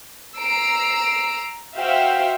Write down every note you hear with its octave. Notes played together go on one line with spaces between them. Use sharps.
A#5 E6 C7 D7
F#4 C5 E5 F5 G5